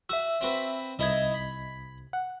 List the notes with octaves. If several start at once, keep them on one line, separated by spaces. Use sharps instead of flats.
F#4 E5 E6
C4 F#4 B4
C2 D#4 E4 D#5 G#6
B5
F#5